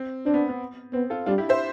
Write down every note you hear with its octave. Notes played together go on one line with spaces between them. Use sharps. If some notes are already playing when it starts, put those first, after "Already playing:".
Already playing: C4
C4 D4
B3
B3
B3 C4
F4 A4
G3 D4 F4
E4 G4
C5 E5